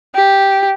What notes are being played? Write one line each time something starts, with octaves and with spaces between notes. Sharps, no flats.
G4